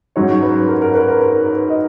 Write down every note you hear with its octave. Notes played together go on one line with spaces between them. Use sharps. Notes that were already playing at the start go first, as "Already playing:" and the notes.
G#2 F#3 C#4 C#5
B4
A#4
A#4
B4
A#4
A#4
B4
D#5